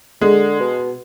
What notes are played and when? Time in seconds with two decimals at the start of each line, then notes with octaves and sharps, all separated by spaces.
0.21 D3 G#3
0.60 B2